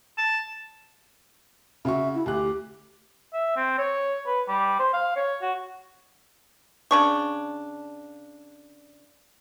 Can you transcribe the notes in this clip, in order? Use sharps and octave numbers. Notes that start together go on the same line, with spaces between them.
A5
C#3 F#4 E5 C#6
E4
D2 G4 F#6
E5
C4
C#5
B4
G3
C5
F5
C#5
F#4
C#3 D4 C#6